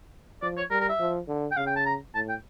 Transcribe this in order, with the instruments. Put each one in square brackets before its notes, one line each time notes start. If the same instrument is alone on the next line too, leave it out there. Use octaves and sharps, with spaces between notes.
[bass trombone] F3 [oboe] D5
[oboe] C#5
[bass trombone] G3 [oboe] A#4
[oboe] A#4
E5
[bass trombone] F3
D3
[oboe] G5
[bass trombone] C#3 [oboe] F5
[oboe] G5
A5
A#5
[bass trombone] A2 [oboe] A5
[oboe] G5